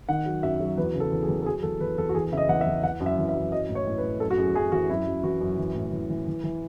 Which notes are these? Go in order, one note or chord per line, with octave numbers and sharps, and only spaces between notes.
D#3 F#5
F#3
F#2 E5
F#3
E2 B4
C#3
A4
E2
G#4
E2
A4
F#3 G#4
E2 A4
E2 B4
E2 A4
F#4
E2 G#4
C#3 E5
D#5
E2 F#5
E5
E2
E3 F#5
F#2
E5
E3
E5
F#2
F#3 D#5
A2
C#5
A2
B4
A2
F#2 A4
F#4
F#2 G#4
F#2 G#4
E3 F#4
F#2 E4
F#2
E3 F#4
F#2
E3
A2
E3
E3
E3
E3